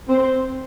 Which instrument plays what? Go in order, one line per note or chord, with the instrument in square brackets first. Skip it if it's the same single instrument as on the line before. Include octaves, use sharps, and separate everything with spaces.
[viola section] C4 C5